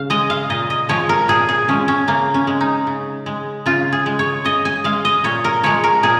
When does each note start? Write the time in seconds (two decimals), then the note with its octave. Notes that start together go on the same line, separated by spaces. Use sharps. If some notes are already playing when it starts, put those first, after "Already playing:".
Already playing: C#3 F5
0.10 G#3 D#5
0.30 F5
0.50 A#2 D#5
0.70 D#5
0.89 F3 G#3 C#5
1.09 A#4
1.28 A#2 G#4
1.49 G#4
1.68 F3 G#3 C#4
1.88 C#4
2.08 C#3 A#3
2.34 C#4
2.47 G#3
2.61 D#4
2.87 C#3
3.26 G#3
3.66 C#3 F4
3.92 G#4
4.06 G#3
4.19 C#5
4.45 C#3 D#5
4.65 G#5
4.84 G#3 F5
5.05 D#5
5.24 A#2 C#5
5.44 A#4
5.63 F3 G#3 C#5
5.84 A#4
6.03 A#2 G#4